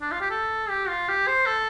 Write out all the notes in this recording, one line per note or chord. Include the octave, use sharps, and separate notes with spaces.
D4
F4
G4
A4
G4
F4
G4
C5
A4